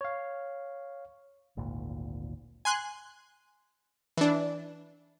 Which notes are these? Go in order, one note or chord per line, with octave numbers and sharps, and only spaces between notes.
C#5 F5
G#1 D2 A#2
G#5 C6 F#6
E3 D4